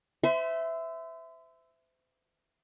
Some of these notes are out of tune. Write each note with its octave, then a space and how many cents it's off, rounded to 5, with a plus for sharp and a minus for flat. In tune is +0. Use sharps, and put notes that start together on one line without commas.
C5 -40 E5 +0 C6 -20